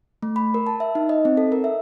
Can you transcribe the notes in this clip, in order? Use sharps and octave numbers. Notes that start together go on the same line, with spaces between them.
A3
B5
A#4
A5
E5
D#4
D#5
C4
A4
A#4
E5